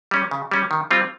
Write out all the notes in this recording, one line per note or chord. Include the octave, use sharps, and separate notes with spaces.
G3 C#4
C#3
G3 C#4
D#3
G3 C4 F4